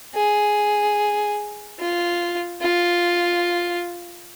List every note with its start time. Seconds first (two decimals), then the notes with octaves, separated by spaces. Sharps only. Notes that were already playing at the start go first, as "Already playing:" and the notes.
0.15 G#4
1.80 F4
2.61 F4